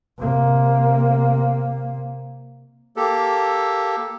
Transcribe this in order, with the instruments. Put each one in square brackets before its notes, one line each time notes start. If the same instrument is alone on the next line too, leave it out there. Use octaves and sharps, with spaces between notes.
[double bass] C3 A#3
[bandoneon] A#3 G4 A4